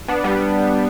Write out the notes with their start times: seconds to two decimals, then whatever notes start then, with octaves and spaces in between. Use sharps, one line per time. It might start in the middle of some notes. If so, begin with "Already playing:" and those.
0.08 B3 D4
0.24 G3 B3